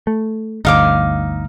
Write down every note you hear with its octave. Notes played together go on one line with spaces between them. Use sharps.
A3
G1 D2 D#4 F5 D6